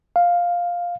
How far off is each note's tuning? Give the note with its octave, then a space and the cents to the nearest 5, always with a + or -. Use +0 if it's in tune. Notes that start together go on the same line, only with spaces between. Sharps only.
F5 +5